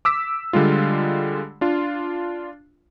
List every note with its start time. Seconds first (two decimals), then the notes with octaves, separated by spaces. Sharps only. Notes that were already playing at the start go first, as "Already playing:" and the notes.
0.05 D6 E6 B6
0.53 D3 G3 G#3 F4
1.61 D4 F4